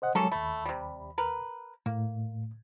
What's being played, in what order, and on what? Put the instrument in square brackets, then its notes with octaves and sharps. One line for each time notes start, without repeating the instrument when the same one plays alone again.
[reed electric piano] C5 D#5 F#5
[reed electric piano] F#3 G#3 C#5 [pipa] A#3 C#4 A4
[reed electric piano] D#2 B5 [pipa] A3
[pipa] C3 G3
A#4 B4
[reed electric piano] A2 [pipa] A#3